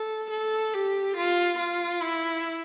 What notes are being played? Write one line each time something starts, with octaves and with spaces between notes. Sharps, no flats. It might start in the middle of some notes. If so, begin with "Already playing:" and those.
Already playing: A4
A4
G4
F4
F4
E4